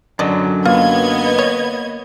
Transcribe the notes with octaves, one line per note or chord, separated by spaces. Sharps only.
F#2 D3 F#3 D5 D#5
A#3 B3 F4 D#5 G#6
C#5